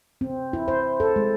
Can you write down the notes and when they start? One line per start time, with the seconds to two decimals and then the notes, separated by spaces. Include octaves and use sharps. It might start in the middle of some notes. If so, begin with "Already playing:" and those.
0.21 C4
0.53 E4
0.68 C5
1.00 A4
1.16 G#3